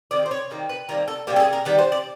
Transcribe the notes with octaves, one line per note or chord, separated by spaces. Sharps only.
C3 D#3 D5
C5
C#5
C3 D#3 G3 A#3
B4
C3 D#3 G3 A#3 A#4
A4
C3 D#3 G3 A#3 G4
A4
G#4
A#4
D#3 G3 B3 B4
C5
D5